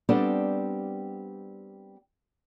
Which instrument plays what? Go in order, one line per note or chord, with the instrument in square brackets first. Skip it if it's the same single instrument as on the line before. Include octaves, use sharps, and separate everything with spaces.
[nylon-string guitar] G3 B3 C4 D4 G4 A4